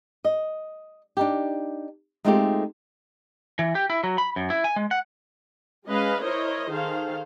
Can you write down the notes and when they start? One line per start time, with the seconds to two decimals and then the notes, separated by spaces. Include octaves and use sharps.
0.25 D#5
1.17 D4 D#4 G4
2.25 G#3 A3 C4 D#4 F4 G4
3.59 E3
3.75 G4
3.90 E4
4.04 F#3
4.18 B5
4.36 F#2
4.50 E4
4.64 G#5
4.76 G#3
4.91 F#5
5.87 G#3 C#4 B4 D#5 F5
6.22 E4 A#4 C5 C#5 D#5
6.71 D#3 G#4 A4 C5 F5